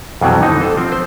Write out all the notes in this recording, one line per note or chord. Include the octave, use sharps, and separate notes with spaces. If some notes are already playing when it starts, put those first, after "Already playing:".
F2 B2 E3 F#3 G3
D3 E3 D#4
A4 C5
F3 C4
C5